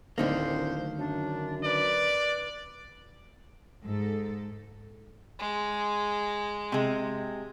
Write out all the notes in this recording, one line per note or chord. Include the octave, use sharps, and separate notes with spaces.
D1 D3 D#3 A#3 C5
F#2 D4
B4 D5
G#2 A4
G#3
C3 G#3